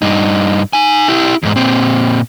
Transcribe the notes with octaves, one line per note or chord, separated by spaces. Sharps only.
G2 D#4
D#4 G#5
E4 G4
E2 G#2
A#2 C4